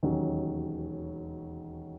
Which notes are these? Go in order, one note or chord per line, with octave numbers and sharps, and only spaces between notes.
E1 D#2 D#3 F#3 C#4